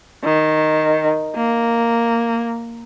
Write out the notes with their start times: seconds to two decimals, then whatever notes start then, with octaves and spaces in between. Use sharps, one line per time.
0.24 D#3
1.36 A#3